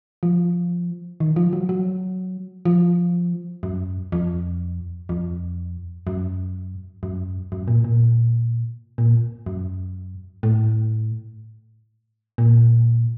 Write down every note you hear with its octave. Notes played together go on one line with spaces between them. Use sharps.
F3
D#3
F3
F#3
F#3
F3
F#2
F2
F2
F#2
F#2
F#2
A#2
A#2
A#2
F#2
A2
A#2